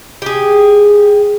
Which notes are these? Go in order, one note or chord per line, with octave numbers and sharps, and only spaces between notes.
G4 G#4